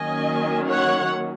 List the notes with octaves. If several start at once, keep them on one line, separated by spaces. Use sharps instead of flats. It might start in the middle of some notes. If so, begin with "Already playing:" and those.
Already playing: D#3 F#3 A#3 C#4 D#5 G#5
C#5 F#5